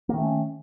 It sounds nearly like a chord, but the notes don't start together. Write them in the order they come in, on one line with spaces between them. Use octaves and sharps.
A#3 D#3 A3 C#4